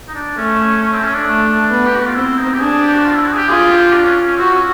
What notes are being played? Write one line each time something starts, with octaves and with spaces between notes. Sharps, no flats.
D#4
D4
A3 C#4
C#4
C#4
C4
C#4
D4
A3
B3
G4
F#4
F4
C4 E4
D#4
G4
D4 G#4
G4
F#4
F4
E4
F#4
G#4
G4
F4 G#4
G4
D4
C#4
C#4
C4 F#4
C#4